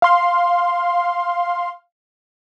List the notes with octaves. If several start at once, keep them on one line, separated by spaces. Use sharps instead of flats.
F5 C6